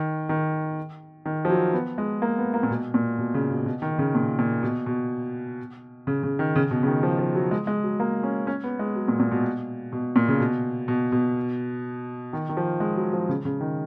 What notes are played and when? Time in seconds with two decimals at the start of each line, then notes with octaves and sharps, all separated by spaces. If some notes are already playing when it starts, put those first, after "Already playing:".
Already playing: D#3
0.29 D#3
1.25 D#3
1.45 F3
1.50 F#3
1.73 B3
1.98 G#3
2.22 A#3
2.38 B3
2.54 A#3
2.63 A#2
2.70 B2
2.94 A#2
3.19 B2
3.34 C#3
3.51 B2
3.66 B2
3.82 D#3
3.98 C#3
4.15 A#2
4.39 A#2
4.63 B2
4.86 B2
6.07 C#3
6.23 C#3
6.39 D#3
6.56 C#3
6.71 B2
6.83 C#3
6.87 D#3
7.03 F3
7.19 F3
7.35 F#3
7.51 G#3
7.67 G#3
7.84 F#3
8.00 A#3
8.23 C#4
8.47 C#4
8.64 B3
8.79 G#3
8.95 F#3
9.08 A#2
9.20 A#2
9.32 B2
9.92 B2
10.16 A#2
10.28 C#3
10.40 B2
10.88 B2
11.12 B2
12.33 D#3
12.49 D#3
12.57 F3
12.80 G#3
12.96 F#3
13.13 F3
13.29 C#3
13.45 C#3
13.61 D#3